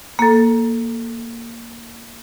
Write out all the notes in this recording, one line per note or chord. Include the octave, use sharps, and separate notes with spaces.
A#3 A4